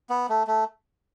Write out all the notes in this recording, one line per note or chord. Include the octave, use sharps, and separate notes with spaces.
B3
A3
A3